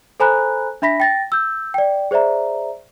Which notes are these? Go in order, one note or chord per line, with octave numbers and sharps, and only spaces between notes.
A4 C5 G#5 A#5 B5 F#6
D4 E5 B5 A#6 B6
G5 A6 A#6
E6 G6
D5 G5
G#4 C5 D5 E5 A#5